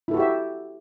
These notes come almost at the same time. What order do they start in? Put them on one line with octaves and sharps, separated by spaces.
E4 A4 F#4 G4 E5